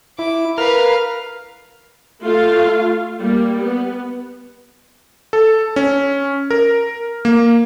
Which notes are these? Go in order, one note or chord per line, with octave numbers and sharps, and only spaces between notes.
E4 D6
A#4 B4 F5 F6
A3 F4 F5
G3 A#3
B3
A4
C#4
A#4
A#3